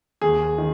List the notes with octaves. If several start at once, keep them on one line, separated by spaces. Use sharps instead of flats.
D#2 G#4
D#3